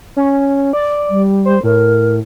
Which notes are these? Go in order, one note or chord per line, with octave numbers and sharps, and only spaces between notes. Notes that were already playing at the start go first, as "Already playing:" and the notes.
C#4
D5
G3
C5
A2 A#4